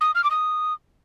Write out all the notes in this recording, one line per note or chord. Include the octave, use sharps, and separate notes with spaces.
D#6
F6
D6
D#6